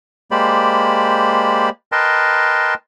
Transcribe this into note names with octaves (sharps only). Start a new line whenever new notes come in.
G#3 A#3 G4 C5 D5 B5
A#4 B4 D#5 G5 A5 C6